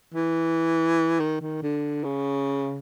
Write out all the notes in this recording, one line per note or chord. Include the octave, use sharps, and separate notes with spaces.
E3
D#3
D#3
D3
C#3